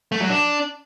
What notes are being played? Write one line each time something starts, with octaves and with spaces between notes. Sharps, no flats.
A3
F#3
D4